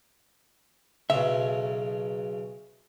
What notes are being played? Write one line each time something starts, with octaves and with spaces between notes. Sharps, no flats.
B1 C#3 E5